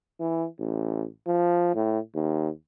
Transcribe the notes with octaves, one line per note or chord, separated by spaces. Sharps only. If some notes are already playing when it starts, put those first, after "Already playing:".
E3
A1
F3
A2
D#2